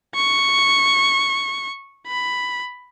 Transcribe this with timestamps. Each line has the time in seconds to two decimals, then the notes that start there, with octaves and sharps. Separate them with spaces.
0.15 C#6
2.08 B5